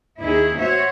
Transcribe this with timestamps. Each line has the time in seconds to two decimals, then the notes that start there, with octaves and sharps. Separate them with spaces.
0.19 D#2 D#4 E4 G#4
0.58 F#4 C5 C#5 E5